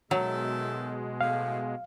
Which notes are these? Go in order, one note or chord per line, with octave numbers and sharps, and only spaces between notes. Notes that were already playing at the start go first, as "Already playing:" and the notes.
B2 D#3 F#3 G#3 A4 E5
A2 F5